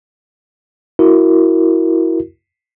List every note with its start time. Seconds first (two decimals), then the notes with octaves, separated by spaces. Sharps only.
0.99 E4 F#4 A#4